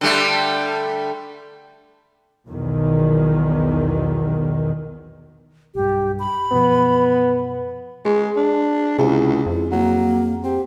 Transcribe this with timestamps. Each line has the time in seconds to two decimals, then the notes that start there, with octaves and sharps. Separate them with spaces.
0.01 D3 G3 A3
2.47 B1 E2 D#3
5.75 B1 G2 G4
6.19 B5
6.51 F#2 B2 F3 B3
8.05 G#3 G#4
8.37 D4
8.99 C#2 C3 E4 G#4
9.46 F2
9.72 F#3 A#3
10.44 C4 G4